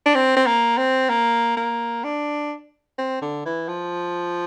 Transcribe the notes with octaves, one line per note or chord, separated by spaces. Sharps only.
D4
C4
C4
A#3
C4
A#3
A#3
D4
C4
D3
E3
F3